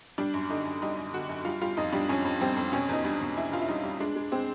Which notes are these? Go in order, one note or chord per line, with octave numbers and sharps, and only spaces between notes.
G3 D4
F#2
D3 D#4
F#2
G3 D#4
F#2
D3 F#4
F#2
G3 F4
G3 F4
F2 D#4
G3 D4
F2 C#4
F2
G3 C4
F2
B2 C#4
E2 D#4
G3 D4
E2
E2 E4
E2 F4
E4
G3 D#4
G3
G#3 D4
G#3
G#3 C4